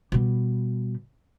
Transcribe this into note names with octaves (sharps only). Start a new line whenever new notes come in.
B2 G3